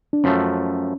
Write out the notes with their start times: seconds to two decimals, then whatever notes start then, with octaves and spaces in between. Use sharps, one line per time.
0.13 D4
0.24 F#2 F3 A3 C#4